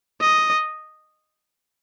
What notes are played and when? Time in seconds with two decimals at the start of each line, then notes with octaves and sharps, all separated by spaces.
0.21 D#5